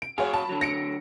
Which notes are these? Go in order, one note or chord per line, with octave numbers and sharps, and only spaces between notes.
D7
F#3 F#4 G#4 C#5 F5
A5 B5
D3 F#3
A#6 C#7 D7